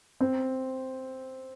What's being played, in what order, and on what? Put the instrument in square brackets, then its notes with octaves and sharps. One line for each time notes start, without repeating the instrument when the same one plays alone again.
[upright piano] C4